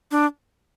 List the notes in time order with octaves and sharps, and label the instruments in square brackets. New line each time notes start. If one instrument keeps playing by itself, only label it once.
[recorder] D4